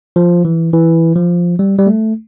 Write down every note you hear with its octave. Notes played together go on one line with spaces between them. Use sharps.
F3
E3
E3
F3
G3
G3
A3